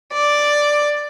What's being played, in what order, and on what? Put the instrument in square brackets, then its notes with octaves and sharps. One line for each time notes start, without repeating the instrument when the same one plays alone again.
[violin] D5